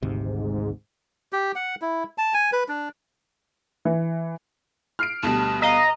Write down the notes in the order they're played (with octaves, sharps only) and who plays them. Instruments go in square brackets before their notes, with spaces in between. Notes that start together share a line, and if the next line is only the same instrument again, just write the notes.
[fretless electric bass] G#1 D2 C3 [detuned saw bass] G#2
[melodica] G4
F#5
E4
A5
G#5
B4
D4
[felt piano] E3
[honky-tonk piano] F6 C7 D7
[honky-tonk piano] D2 B2 G3 [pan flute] A5
[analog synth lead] D#5 [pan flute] F5 [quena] A#5